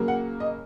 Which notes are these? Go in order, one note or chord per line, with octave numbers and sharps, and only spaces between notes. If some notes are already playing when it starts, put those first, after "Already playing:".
Already playing: C#3 F#3 A#3
F#5
D#5